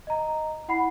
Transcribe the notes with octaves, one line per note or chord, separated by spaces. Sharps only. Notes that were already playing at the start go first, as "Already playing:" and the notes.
D#5 A#5
E4 F#5 B5 C7